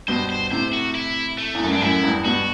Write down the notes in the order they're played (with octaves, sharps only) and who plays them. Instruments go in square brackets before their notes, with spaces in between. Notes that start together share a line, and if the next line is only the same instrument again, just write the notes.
[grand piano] G2 B2 [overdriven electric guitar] C5
[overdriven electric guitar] C5
[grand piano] A2 C3 [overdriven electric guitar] C5
[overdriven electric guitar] F#4
E4
A3
[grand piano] E2
F#2
[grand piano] G2 [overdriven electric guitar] D4
[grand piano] F#2 A2 [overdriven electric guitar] E4
[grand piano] E2 G2
[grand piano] G2 B2 [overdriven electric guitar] F#4